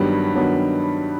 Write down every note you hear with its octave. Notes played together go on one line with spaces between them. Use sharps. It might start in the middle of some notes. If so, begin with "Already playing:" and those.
Already playing: G2 D#3 F#3 G3 B3
G2 D#3 F#3 B3